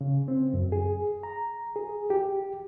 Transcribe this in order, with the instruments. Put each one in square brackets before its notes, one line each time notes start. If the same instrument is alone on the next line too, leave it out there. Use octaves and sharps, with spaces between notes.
[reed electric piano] C#3
C4
F#2
G#4
A#5
G#4
G4